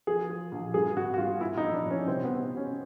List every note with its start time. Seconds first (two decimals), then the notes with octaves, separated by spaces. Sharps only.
0.07 F3 G#4
0.29 F3
0.52 A#1
0.74 G2 G#4
0.96 G#1 F#4
1.14 F#4
1.18 G2 F4
1.41 A#2 E4
1.57 D#4
1.64 A#1
1.74 D4
1.86 A#1 C#4
2.08 C2 C4
2.24 B3
2.30 C2
2.51 C3
2.57 C#4